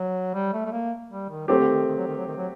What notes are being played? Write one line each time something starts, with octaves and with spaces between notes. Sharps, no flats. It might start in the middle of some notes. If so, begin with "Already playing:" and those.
Already playing: F#3
G3
A3
A3
A#3
G3
D#3
F#3 A3 C4 G4
D3
D#3
D#3
F#3
D#3
F#3
D#3
F#3